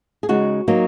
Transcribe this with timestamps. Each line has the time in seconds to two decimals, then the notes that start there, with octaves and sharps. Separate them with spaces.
0.23 G#4
0.29 C#3 G#3 D#4 F#4
0.68 F#3 A#3 D#4